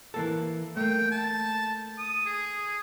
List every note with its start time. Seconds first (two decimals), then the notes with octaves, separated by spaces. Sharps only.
0.14 E3 A#3 A4
0.77 A3 A#3 G5
1.12 A5
1.98 D#6
2.26 G#4